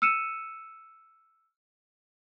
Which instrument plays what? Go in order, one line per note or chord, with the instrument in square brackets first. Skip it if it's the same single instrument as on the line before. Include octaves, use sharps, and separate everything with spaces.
[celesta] E6 F6 C#7 D#7 E7